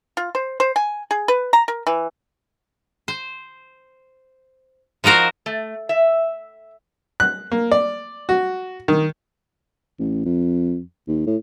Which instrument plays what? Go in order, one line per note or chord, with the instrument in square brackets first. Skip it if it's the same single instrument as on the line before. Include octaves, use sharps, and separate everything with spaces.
[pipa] F4
C5
C5
G#5
G#4
B4
A#5
A#4
E3
[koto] C5
F3 D#4 F#4 A#4 C5
[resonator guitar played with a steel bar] A3
E5
[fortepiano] F#6
A#3
D5
F#4
D#3
[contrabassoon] A1
F2
D#2
A2